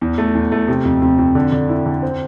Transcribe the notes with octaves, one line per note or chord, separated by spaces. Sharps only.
E2
A3
E2
A3
C3
F2
F2
F2
D3
D3
E4
D3
C4